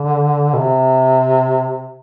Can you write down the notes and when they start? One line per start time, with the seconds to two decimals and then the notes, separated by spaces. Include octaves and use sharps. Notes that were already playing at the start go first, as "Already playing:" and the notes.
Already playing: D3
0.54 B2
0.58 C3